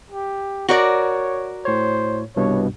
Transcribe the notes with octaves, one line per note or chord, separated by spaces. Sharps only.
G4
F#4 A#4 C#5 D5
A2 C5 C#5
C2 G2 B2 C#5